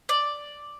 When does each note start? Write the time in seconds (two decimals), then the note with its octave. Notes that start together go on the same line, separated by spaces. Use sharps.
0.09 D5